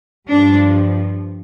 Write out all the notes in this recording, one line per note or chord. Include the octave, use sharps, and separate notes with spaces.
G2 F3 D4